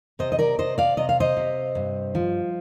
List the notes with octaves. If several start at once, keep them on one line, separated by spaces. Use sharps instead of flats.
C3 C5 D#5
D#5
A#4 D5
C3 C5 D#5
D5 F5
C3 D#5
F5
C5 D#5
C3
G2
F3